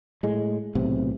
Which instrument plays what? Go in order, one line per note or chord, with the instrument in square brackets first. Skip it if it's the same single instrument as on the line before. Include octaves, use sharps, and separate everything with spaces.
[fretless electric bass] A2 G#3
B1 A2 C3 E3